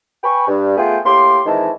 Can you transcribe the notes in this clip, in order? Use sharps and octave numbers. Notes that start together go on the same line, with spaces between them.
B4 G5 G#5 B5 C#6
G2
A3 B3 F4 G#4 G5
A2 A#3 G4 C6
F2 D#3 E3 G#3 E4 A5